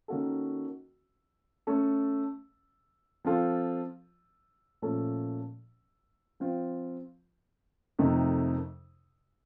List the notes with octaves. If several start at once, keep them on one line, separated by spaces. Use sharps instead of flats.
D#3 A#3 C#4 F#4 A4
A3 C#4 A4
F3 C4 F4 A4
A#2 F3 A3 C#4 A4
F3 C4 F4
F2 C3 D#3 A3 D#4